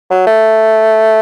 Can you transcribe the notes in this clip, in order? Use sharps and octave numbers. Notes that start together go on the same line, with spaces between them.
F#3
A3